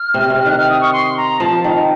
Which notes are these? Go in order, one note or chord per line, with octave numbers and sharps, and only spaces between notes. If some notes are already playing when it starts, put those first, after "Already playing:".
Already playing: F6
C3
C3
D#3 F#6
F6
D#6
C#6
C6
A#5
F3 A5
D#3 A#5